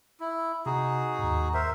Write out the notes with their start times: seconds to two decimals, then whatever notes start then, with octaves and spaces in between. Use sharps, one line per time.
0.20 E4
0.66 C3 D#4 F#4 G#4
1.19 D#2 G#2
1.54 A#4 C5 E5